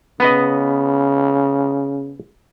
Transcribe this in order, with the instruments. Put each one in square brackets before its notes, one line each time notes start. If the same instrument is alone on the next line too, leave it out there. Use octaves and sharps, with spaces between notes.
[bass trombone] C#3 [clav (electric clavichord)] B3 B4 D#5